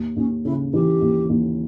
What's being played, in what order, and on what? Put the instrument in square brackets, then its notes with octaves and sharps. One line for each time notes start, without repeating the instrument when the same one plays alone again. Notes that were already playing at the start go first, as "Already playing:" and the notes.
Already playing: [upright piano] D#2
[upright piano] D#2 [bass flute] C#4
[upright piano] C#3 [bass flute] E4
[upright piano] E3 [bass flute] G4
[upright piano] D#2
D#2